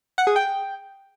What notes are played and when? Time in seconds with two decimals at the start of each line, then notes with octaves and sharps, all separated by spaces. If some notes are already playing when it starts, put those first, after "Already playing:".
0.18 F#5
0.27 G#4
0.36 G5